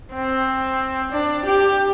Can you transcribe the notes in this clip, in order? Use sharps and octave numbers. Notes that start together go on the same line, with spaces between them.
C4
D4
G4